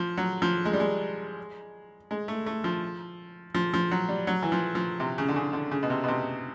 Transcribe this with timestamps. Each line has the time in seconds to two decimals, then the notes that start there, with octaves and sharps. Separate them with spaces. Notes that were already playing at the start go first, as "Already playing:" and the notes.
Already playing: F3
0.17 F#3
0.42 F3
0.65 G#3
0.73 G3
0.80 G#3
2.11 G#3
2.28 A3
2.46 A3
2.64 F3
3.54 F3
3.74 F3
3.91 F#3
4.09 G3
4.27 F#3
4.43 E3
4.52 F3
4.75 F3
5.00 C3
5.18 C#3
5.29 D3
5.36 C#3
5.53 D3
5.71 C#3
5.83 B2
5.90 C3
6.04 B2
6.08 C3